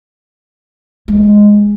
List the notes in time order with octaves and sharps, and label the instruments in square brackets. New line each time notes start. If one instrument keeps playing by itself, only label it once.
[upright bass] G#3